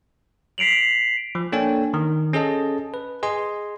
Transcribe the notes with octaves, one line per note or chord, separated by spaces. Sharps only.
B6 C7 D7 F7 F#7
F3
A#3 D4 A4 C#5 G5 G#5
D#3
C#4 G#4 A4 D#5 A5
B4
G#4 D#5 G#5 C6